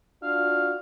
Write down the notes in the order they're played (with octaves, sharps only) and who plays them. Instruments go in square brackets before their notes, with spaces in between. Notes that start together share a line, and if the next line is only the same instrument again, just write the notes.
[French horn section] D4 F4 F#4 [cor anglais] F5